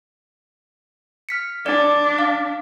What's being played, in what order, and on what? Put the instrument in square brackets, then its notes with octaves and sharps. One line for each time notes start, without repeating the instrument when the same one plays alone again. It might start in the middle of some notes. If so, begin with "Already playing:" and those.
[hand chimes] F6 B6 C#7
[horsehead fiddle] D4 [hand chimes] D5
[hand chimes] F5